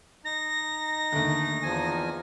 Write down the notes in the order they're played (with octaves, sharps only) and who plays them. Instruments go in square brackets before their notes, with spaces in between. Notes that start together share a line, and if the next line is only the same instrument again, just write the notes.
[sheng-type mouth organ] D#4 [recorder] A#6
[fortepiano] D#2 D3 [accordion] A3
[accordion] E2 F3 G#5